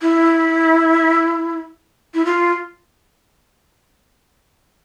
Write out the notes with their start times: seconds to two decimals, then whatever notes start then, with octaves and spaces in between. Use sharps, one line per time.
0.02 E4
2.14 E4
2.25 F4